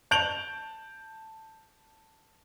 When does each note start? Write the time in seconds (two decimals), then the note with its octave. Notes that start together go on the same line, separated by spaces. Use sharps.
0.11 A5 G6 D7 F7 F#7